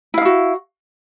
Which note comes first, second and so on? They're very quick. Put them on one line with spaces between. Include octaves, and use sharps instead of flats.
E4 F5 D#4 F#4